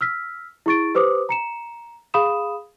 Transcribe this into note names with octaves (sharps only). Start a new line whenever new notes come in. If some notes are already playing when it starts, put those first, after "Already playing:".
E6 F6 B6
E4 G#4 C#6 A6 D7
G4 B4 C5 D6 D#6
A#5 C#7 E7
G#4 F5 B5 D#6 E7